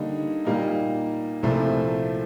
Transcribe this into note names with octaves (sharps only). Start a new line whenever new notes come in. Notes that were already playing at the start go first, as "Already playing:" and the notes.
Already playing: D3 G3 A#3 D#4
A#2 G3 A#3 D#4
C2 A#2 F3 A3